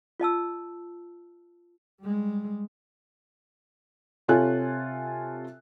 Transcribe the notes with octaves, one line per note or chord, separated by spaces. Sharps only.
F4 D#5 A5 E6
G3 G#3
C3 F4 A4 C#5 G#5 F#6